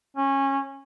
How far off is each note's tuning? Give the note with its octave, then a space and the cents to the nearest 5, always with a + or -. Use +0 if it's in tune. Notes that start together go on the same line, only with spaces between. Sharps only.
C#4 -20